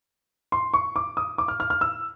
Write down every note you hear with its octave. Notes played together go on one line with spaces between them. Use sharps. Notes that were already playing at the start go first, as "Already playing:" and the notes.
C6
C#6
D6
D#6
D6
F6
F6
F6
E6